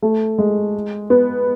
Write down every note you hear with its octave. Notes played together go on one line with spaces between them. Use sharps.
A3
G#3
B3